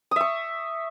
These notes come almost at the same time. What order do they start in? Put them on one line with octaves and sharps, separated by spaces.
D#6 E5 C#6